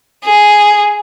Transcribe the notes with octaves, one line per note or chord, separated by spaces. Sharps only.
G#4